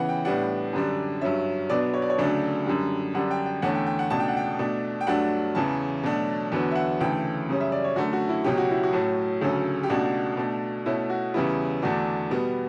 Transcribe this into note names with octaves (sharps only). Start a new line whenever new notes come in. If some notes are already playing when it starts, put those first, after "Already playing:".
Already playing: C#3 E3 B3 F#5
G5
A2 G3 B3 D4 F#5
F#2 D3 G3 D4
G2 F#3 C#4 E5
B2 F#3 B3 D4 D5
C#5
D5
C#5
D2 C#3 F#3 A3 D4
F#2 D3 G3
F#2 D3 G3 D4 F#5
G5
G5
E2 D3 A3 C#4 F#5
G5
G5
F#5
C#2 B2 A3 D4 A5
G5
F#5
G5
B2 A3 D4
G5
G2 F#3 A3 D4 F#5
E2 C#3 E3 A5
B2 F#3 A3 D4
E2 D3 F#3 B3
E5
F#5
D2 C#3 E3 A3 G5
F#2 C#3 G3 C#4
E5
D5
C#5
F#2 D3 A3 C#4 F#4
F#4
E4
C#2 B2 F#3 C#4 G4
F#4
E4
F#4
A2 F#3 A3 C#4
D2 C#3 F#3 C#4 A4
G4
C#2 B2 A3 D4 F#4
B2 A3 D4
B2 A3 C#4 E4
F#4
E2 C#3 G3 B3 E4
E2 D3 A3 D4 F#4
B2 G3 B3